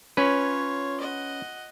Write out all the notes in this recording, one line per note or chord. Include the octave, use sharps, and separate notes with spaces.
C#4 F4 B4 C#5
D#5 F#5